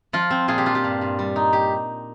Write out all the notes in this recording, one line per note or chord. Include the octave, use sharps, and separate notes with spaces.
F3 F4
C4
A#2 F4 G#4
G4
D4 F4
G4
G2
G2
G3
D#4
G4